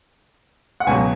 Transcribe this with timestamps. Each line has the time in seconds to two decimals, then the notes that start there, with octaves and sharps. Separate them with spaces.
0.80 F#5
0.87 C#2 B2 F#3 G#5